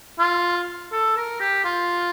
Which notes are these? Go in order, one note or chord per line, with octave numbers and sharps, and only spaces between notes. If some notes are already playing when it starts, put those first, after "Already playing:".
F4
A4
A#4
G4
F4